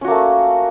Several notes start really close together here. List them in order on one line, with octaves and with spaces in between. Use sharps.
C#4 F#4 A#3 A3